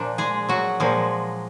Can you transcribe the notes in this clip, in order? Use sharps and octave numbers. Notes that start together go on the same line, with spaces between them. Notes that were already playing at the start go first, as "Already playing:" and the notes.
Already playing: A#2 F3 D4
G#3 G#4
F#3 F#4
A#2 F3 G#3